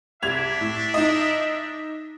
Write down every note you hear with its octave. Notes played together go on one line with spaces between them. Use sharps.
C2 D4 E5 G#6 F7
A2
D#4 D#5